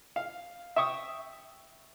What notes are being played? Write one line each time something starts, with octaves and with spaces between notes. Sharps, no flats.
F5
E5 G5 C#6 D#6